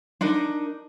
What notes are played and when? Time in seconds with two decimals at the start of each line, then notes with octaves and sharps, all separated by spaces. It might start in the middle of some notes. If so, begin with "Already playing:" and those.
0.21 D4 D#4 A#4